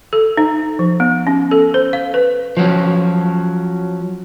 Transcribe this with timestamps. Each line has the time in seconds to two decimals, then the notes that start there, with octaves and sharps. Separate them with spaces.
0.13 A4
0.37 D#4
0.79 F3
1.00 B3
1.27 C#4
1.51 A4
1.74 C5
1.93 F5
2.14 B4
2.57 F3 F#3 C#4